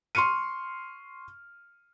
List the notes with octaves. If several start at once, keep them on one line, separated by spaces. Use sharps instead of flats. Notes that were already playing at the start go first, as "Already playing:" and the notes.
C6 C#6 F6 C#7 D#7